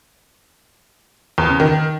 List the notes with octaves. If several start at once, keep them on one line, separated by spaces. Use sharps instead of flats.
E2
C#3
D#3